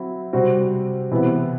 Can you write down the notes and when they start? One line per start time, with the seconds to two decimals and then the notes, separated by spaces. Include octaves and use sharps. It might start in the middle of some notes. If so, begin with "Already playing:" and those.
Already playing: F#3 C4 E4
0.33 C3 G3 C4 F#4
1.11 C3 E3 B3 E4